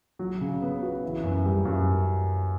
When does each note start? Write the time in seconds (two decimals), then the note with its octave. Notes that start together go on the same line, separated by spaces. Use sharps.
0.19 F#3
0.41 C#3
0.62 B3
0.83 F#4
1.03 E3
1.23 F#2
1.45 G3
1.65 F#2